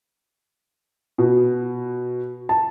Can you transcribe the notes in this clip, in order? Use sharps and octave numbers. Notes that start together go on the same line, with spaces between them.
B2
A5